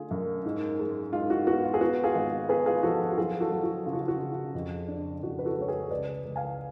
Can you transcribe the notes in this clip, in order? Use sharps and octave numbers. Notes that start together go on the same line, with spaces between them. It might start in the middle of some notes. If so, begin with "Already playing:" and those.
Already playing: D3 A3 F4 G#4
F#2
G#2
G#3
G#2 F4
F#4
B3 F#4
F4
G#4
B3 F#4
F4 G#4
G#1
B3 G#4 B4
F4 G#4
F3 F#4 A4
F#4
F#3 F4 G#4
F#4 A4
F#3
F#4
C#3 F4
F#4
F4
F#4
C#3
F4
F2
D4
F2 F#4
B4
F#4 A4
G#3 C#5
G#4 B4
C#2 B4 D5
C#2
F5 G#5